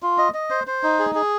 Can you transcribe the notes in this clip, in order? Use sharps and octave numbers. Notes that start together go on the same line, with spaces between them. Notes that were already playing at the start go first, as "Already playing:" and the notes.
F4
D#5
D#5
C5
C5
D#4
G#4
G#4